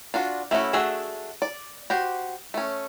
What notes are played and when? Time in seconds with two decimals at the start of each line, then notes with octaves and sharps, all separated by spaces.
0.14 D4 F4 F#4
0.51 A3 C#4 E4 F#4
0.73 A3 D4 F#4 G#4 E5
1.42 D5
1.90 F#4 G4 C5
2.54 A3 C#4